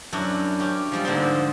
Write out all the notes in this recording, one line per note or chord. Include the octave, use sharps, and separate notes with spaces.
F#2 C#4 D4 E4
C#4 G4
F3 G3 G#3
G#2 D3 A#3 C4